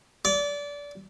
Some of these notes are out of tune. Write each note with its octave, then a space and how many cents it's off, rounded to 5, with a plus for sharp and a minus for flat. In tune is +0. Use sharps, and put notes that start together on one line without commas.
D5 -25